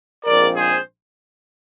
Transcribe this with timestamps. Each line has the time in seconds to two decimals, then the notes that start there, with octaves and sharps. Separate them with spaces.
0.25 A#1 G#2 F3 C4 A#4 D5
0.56 G#4 C5